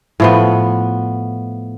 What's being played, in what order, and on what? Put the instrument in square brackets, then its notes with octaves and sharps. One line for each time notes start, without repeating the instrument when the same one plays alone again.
[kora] A2 F3 B3